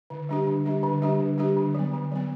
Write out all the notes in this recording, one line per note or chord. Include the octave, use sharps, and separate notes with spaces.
D3
G3 D4 G4
D3
G3 D4 G4
D3
G3 D4 G4
D3
G3 D4 G4
D3
F#3 B3
D3
F#3 B3